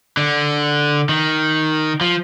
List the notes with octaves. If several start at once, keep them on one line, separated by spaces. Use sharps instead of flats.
D3
D#3
F3